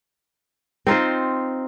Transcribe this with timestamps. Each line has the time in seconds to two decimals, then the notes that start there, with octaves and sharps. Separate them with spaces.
0.87 C4 D#4 F4 C5